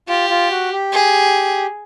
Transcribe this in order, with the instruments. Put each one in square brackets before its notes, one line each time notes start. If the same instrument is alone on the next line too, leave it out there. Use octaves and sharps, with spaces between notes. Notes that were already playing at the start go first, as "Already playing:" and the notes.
[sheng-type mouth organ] F4 [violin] G4
[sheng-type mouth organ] F4
F#4
G4
[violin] G#4